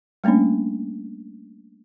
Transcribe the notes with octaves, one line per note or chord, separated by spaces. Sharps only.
G3 A3 A#3 C#4 D4